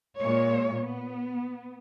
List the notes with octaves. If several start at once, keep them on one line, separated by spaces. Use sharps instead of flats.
A#2 G#3 C#5
B3